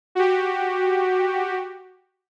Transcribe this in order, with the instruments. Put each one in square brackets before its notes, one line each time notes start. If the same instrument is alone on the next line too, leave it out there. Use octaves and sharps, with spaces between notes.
[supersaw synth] F#4 G4